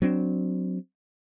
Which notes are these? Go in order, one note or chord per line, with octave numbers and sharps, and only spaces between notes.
F#3 C4 D4